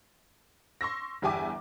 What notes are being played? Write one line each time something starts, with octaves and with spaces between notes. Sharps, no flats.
C6 C#6 E6 A#6
G1 E2 G4 E5 G#5 D6